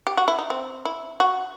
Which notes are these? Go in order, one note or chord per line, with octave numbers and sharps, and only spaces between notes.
G4
F#4
E4
D#4
C4
E4
F#4